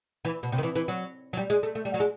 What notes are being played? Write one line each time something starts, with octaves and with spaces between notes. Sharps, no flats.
E3
B2
C3
D#3
E3
E3
F#3
F#3
G3
G#3
A3
A3
G3
F#3
G#3